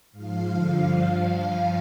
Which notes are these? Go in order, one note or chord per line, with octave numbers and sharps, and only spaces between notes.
G#2 F3 F5
G2 D3 F3 F5
G2 F3